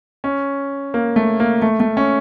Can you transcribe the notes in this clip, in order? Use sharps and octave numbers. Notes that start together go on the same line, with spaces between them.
C#4
A#3
A3
A#3
A3
A3
C#4